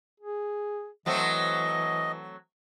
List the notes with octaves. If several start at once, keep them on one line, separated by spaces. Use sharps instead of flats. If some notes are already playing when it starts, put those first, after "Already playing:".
G#4
E3 F#3 A3 C4 D#5